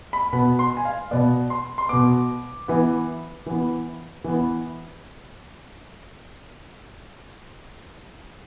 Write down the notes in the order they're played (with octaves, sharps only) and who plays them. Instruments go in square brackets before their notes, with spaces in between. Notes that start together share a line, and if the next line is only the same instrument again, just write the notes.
[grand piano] B5
B2 B3 B5
C6
G#5
F5
B2 B3 D5
C6
C6
B2 B3 D6
E3 B3
E3 B3
E3 B3